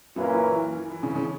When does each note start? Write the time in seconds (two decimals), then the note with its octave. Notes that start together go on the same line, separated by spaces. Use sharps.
0.16 F#2 A#2 F#3 A#3 C#4 E4 B4
0.33 E3
0.50 E3
0.78 E3
0.90 E3
1.03 C#3 C#4
1.15 C#3 C#4